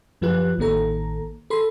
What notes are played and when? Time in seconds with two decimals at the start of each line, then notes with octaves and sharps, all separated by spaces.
0.21 F#2 F3 F4 G4 B4 F#6
0.58 A1 D#3 A#3 A4 A#5
1.50 A4 B5 C6